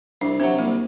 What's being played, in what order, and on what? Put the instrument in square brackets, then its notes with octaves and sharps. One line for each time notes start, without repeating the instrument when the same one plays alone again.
[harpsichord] C2 [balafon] D4
[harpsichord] C3 F#3 [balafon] C4
[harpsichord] C2 [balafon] A#3